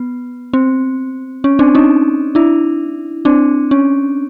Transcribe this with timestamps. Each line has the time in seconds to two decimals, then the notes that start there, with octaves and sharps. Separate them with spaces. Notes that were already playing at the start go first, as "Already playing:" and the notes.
Already playing: B3
0.53 C4
1.44 C#4
1.59 C4 D4
1.75 C#4 D#4
2.35 D4 E4
3.25 C4 D4
3.71 C#4